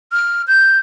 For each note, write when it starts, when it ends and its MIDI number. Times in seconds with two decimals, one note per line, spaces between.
0.12 0.42 89
0.48 0.79 91